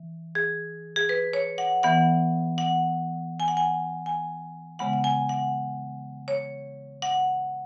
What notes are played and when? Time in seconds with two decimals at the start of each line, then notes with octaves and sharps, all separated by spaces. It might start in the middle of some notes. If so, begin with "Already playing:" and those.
Already playing: E3
0.35 G#4
0.96 G#4
1.09 B4
1.33 C#5
1.58 F#5
1.83 E3 B3 F#5
2.58 F#5
3.40 G#5
3.48 F#5
3.57 G#5
4.06 G#5
4.79 C#3 G#3 B3 F#5
4.93 F#5
5.04 G#5
5.29 F#5
6.28 C#5
7.02 F#5